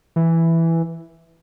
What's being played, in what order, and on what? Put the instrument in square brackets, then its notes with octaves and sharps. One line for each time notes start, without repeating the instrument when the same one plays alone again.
[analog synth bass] E3